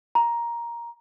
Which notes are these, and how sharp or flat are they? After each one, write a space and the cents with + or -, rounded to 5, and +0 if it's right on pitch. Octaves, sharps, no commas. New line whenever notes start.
A#5 +10